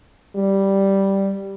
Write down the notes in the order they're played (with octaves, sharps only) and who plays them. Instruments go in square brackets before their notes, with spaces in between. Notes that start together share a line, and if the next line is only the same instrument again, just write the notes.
[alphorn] G3